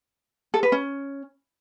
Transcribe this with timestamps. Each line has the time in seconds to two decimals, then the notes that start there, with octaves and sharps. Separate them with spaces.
0.54 A4
0.63 B4
0.72 C#4